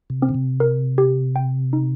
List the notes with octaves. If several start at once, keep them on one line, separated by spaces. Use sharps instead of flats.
C3
C4
D3
C3
A#4
G4
G5
D#4